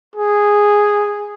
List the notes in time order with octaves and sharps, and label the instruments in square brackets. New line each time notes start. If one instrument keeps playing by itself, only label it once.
[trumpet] G#4